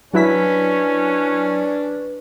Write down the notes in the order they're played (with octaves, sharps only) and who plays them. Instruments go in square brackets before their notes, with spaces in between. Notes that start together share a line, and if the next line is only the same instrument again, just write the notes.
[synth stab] F#3 E4 B6 [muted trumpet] C#4 [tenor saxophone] D4 [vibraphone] B4